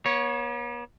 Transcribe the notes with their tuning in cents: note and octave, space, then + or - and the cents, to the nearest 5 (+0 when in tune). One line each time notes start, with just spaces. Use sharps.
B3 -45 C#5 +0